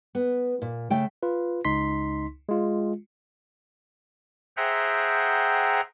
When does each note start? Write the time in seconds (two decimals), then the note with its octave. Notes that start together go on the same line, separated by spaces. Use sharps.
0.15 B3
0.62 A#2
0.90 C#3 A3 G5
1.23 F4 B4
1.65 C#2 D#4 C6 B6
2.49 G#3 F4
4.57 G#4 C5 E5 F#5 G5 A#5